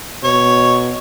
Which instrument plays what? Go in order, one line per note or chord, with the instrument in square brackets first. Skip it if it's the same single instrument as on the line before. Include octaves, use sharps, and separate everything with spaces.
[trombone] B2 [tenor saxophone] C#5